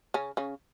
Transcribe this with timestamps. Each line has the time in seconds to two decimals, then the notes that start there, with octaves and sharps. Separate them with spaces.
0.14 C#3 C#4
0.37 C#3 C#4